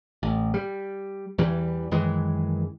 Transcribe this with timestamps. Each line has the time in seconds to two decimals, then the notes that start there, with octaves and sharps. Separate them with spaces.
0.23 A1
0.54 G3
1.38 E2 E3 G3
1.91 F#2 D#3 E3 G#3